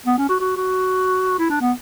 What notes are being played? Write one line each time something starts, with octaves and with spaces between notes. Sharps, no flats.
B3
C#4
F#4
F#4
F#4
E4
D4
B3